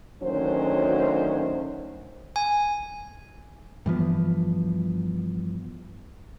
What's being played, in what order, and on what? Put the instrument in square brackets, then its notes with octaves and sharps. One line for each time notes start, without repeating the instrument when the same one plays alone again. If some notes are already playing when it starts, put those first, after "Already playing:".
[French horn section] D2 D#3 F#3 C#4 C5
[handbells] G#5
[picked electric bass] G2 E3 F3 B3